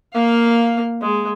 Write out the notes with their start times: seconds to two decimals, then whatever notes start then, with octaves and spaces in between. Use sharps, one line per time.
0.14 A#3 F5
1.02 G#3